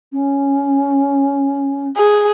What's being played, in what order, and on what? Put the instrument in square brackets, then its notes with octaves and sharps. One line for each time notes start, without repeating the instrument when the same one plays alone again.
[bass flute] C#4
[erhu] G#4